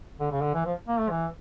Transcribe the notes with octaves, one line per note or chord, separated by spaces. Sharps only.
D3
C#3
D3
E3
F3
A#3
A3
E3